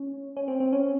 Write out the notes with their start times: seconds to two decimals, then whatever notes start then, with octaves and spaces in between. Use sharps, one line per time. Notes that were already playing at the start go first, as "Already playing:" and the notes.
Already playing: C#4
0.37 C#4
0.48 C4
0.60 C4
0.73 C#4